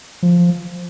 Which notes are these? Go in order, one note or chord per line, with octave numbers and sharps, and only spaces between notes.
F3